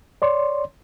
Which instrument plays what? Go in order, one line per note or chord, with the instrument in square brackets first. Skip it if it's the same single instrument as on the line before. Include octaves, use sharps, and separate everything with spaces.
[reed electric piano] C#5 D5 C6